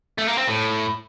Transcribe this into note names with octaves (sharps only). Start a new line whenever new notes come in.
A3
A#3
C4
A2